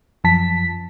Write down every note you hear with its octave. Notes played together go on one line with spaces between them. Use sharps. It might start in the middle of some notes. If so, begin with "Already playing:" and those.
F#2 F3 A5 B6